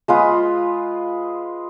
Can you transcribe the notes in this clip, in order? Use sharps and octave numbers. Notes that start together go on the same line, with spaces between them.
G#3 F4 B4 D#6